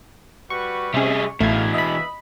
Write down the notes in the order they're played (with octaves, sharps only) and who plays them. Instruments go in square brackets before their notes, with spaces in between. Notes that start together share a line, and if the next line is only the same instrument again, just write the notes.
[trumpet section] G3 F#4 B4 [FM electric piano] C#6
[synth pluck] C3 C#4 [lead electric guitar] G3 G#4 [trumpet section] D#5 E5
[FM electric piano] A1 G#6 [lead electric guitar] B2 E3 [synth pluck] A3 [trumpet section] D#4 F5
[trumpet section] B4 E5 [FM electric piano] D#5 B5